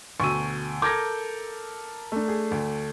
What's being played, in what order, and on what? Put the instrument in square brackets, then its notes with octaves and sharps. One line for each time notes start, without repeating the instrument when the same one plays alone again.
[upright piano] D2 B2 E6 [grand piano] C#6 D#7
[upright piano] A4 A#4 G6 [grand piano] D6 G#6 A#6
[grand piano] A3 D4
[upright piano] G#4
D2